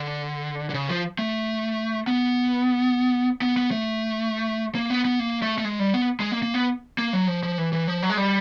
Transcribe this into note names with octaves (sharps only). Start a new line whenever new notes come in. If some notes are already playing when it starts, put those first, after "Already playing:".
Already playing: D3
D3
C#3
F3
A3
B3
B3
B3
A3
A#3
B3
B3
A#3
A3
A3
G#3
G3
B3
G#3
A#3
A#3
B3
A#3
F#3
F3
F3
E3
E3
F3
F#3
G#3
G3